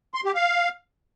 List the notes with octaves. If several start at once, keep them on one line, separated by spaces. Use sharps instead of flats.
C6
G4
F5